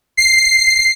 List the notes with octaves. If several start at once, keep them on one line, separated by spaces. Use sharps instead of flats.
C7